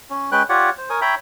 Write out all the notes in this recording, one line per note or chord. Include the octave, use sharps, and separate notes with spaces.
C#4
G#3 C#4 B4 G5 F#6
F4 G4 C#5 D5 F#5
C5
A#4 C#5 G#5 D#6
C#5 E5 G5 A#5 B5